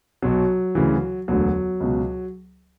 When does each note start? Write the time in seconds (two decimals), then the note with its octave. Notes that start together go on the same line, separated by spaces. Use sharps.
0.22 B1 B2 F#3
0.75 D2 C#3 E3
1.28 E1 D2 D3 F#3
1.80 C#2 B2